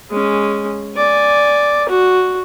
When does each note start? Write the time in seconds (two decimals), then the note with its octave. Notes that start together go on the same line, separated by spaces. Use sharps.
0.11 G#3 C#4
0.97 D5 G#5
1.89 F#4